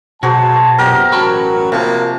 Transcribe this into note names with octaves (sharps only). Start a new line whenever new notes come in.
B2 F#3 F#4 G#4 C5 A5
F#2 A#2 B3 G4 A#4 D#5
A1 F#3 C#4 F#4 A#4 G5 A5 B5
C3 F3 A#3